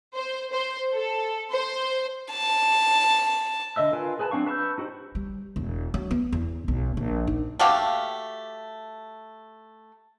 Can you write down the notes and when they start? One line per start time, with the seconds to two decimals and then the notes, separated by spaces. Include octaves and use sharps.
0.15 C5
0.53 C5
0.94 A4
1.52 C5
2.32 A5
3.76 D3 D#5 E5 E6
3.93 F4 A#4 B4 F5 G#5
4.19 G#4 B4 G#5 A5
4.31 F#3 C4 D4 F5 C#6
4.46 B4 A5 C#6 E6 G6
4.78 D#4 F#4 G4 C5
5.15 G3
5.56 E1
5.94 F#3
6.11 B3
6.33 E2
6.68 B1
6.97 A#1
7.27 D#4
7.59 A3 F#4 G4 F5